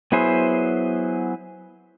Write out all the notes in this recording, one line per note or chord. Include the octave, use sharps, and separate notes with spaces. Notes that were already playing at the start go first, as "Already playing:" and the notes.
F#3 B3 E4 G#4 C5